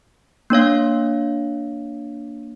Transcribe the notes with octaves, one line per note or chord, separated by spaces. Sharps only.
A#3 D4 C#5 F5